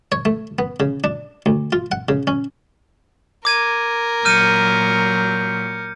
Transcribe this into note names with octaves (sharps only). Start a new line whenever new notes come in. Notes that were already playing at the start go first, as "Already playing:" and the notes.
C#5
A3
B3
C#3
D4
D2
F4
F#5
C#3
C#4
A#4 D6 G#6 D#7
A#2 F#3 F6 G6 C#7 D#7